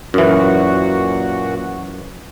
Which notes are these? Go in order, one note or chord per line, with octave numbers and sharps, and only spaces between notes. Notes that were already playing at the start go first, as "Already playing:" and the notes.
F#2 A#2 E3 F#4